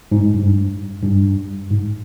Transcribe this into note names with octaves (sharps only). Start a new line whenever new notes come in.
G#2
G2
G2
G#2